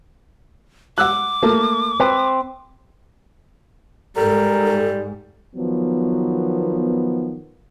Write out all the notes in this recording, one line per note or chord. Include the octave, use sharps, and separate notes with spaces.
F#5 D6 E6 F#6
A3 A#3
C4 B4
G#2 G3 A4 A#4
D#3 F3 F#3 B3